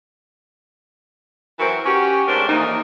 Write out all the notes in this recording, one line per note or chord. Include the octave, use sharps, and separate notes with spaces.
E3 F#3 C4 F#4 A#4
C#4 F#4 G4
G#2 A3 C#4 D4 A#4 C5
F2 A#2 E3 F3 A#3 D#4